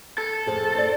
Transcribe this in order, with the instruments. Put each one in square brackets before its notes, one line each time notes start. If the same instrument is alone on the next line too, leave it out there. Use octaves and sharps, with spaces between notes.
[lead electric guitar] A4
[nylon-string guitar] F2 G#4 C5
C5 D5